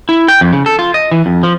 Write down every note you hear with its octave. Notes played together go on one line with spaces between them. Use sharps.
E4
G5
F2
C#3
A4
F4
D#5
E3
F2
F3